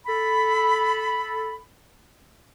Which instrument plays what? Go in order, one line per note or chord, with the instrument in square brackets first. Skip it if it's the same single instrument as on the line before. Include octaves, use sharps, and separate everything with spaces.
[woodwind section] A4 B5